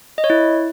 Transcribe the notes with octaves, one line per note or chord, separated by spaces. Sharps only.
D#5
C#5
E4